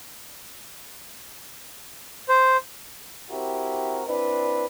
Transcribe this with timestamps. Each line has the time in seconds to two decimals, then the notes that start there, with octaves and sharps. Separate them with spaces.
2.29 C5
3.30 C4 E4 F#4 G4 A#4
4.07 C4 D4 E4 B4